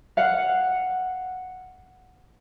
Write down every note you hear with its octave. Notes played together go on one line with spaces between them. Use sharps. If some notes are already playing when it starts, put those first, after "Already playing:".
F5 F#5